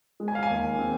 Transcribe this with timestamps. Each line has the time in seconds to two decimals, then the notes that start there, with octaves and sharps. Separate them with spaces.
0.20 G#3
0.28 G#5
0.35 F5
0.43 G#5
0.50 D#2
0.79 C4